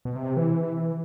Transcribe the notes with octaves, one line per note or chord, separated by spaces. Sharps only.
B2
C3
E3